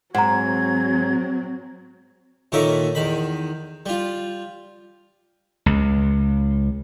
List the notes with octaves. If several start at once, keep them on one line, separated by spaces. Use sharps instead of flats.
G#2 F#3 C4 F#5 A#5 G#6
A#2 D#3 A#3 C#4 A4 E5
E2 D#3 B5
G3 F4
C#2